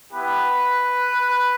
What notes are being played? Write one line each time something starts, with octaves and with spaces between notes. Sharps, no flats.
B3 E4 G4 B4